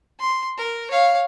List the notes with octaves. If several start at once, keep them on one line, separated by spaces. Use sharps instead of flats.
C6
A#4
C#5 F5